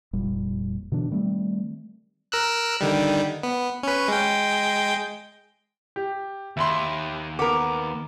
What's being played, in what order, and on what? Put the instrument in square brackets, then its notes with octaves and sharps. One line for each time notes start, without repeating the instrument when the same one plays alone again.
[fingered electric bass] F1 A#2 G3
B2 D3 E3 D4
D#3 G3 A3 C4
[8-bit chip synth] A#4 E6 F#6
D3 D#3 G3
B3
C#4 B4
G#3 G5
[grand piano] G4
[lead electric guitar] D#2 [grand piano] E5 B5 C6
[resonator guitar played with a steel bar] B3 A#4 [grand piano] D6